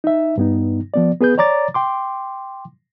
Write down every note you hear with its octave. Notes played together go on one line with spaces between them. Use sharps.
D#4 E5
G2 B3 D#4
F3 B3 D5
B3 G#4 B4 G6
C#5 D5 A#5 D6 A6
G5 C6 D6